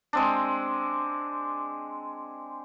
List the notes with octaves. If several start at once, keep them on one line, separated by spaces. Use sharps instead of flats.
G#3 C4 D4